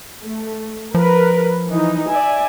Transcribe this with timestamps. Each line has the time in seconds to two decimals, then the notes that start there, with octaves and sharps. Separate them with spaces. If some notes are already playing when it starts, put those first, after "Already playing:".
0.21 A3
0.95 F3 A#4 B4
1.69 E3 D#4
2.10 D5 E5 G#5